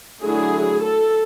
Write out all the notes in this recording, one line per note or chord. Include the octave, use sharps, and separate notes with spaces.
D3 F#3 A3 E4 G#4
A4